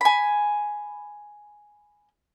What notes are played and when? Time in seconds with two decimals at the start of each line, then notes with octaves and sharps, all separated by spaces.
0.01 G#5 B5